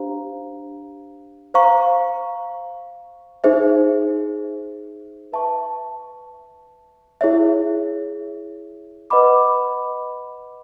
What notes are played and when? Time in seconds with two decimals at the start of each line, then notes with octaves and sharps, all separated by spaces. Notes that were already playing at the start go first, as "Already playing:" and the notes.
Already playing: D4 G4 C5 F5 A#5
1.54 C5 F5 A#5 C#6
3.44 D#4 G#4 C5 E5
5.32 B4 E5 A5 C#6
7.21 E4 G#4 C#5 E5
9.10 B4 D#5 F#5 B5 D6